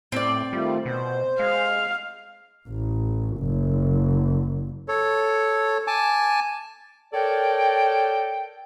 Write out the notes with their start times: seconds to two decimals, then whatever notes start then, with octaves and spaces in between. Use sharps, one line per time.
0.12 A2 C4 D5
0.53 D#3 G3 A3 F4
0.86 B2 C5
1.39 G#3 F5
2.68 A1
3.39 F#1
4.88 A4 C#5
5.87 G#5 A5 D6
7.13 A4 A#4 C#5 D5 G5